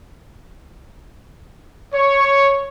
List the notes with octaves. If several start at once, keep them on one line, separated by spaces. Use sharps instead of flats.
C#5